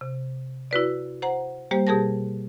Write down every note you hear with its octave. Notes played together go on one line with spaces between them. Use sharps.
C3
E4 F#4 B4 D5
C5 F#5 A#5
G3 A#3 G4 C5
B2 G4 G#4 A#4 A5 A#6